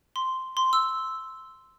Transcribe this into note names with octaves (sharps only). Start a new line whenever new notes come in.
C6
C6
E6